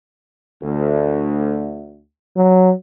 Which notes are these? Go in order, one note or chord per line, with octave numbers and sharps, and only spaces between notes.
D2
F#3